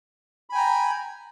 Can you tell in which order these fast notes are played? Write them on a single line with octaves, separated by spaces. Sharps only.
B5 G#5 G5 A#5